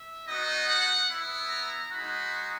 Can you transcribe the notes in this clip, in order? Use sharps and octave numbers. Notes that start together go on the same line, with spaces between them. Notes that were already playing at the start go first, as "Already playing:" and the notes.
Already playing: E5
B3 D#4 F#4 D#5
F#5
B3 E4
A#5
G#3 D#4 F#4 B5